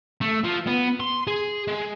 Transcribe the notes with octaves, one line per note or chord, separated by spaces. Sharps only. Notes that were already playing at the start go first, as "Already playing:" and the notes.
A3
F3
B3
C6
G#4
G#3